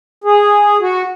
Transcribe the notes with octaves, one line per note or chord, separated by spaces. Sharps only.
G#4
F#4